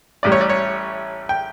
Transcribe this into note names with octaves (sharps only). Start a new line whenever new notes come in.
A1 A2 G3 D5
C#5
D5
C#5
G5